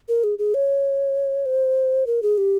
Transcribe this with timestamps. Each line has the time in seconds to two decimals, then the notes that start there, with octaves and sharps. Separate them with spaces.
0.08 A#4
0.24 G#4
0.39 G#4
0.54 C#5
1.46 C5
2.07 A#4
2.23 G#4
2.38 G4